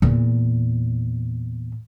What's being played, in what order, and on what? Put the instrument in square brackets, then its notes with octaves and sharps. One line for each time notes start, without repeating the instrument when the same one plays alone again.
[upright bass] E2 A#2